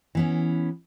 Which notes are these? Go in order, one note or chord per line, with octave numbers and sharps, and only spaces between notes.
E3 B3 C#4